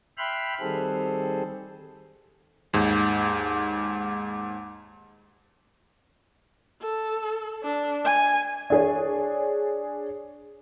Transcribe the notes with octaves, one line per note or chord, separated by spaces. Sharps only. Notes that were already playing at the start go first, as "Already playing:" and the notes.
E5 G5 B5 C6 F6 F#6
D#3 G3 C4 G#4 A4 C5
D#2 G#2
A4
D4
G#5
D4 G#4 C#5